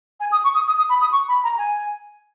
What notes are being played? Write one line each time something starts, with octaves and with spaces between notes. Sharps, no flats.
G#5
D#6
C#6
D#6
D#6
D#6
B5
D#6
C#6
B5
A#5
G#5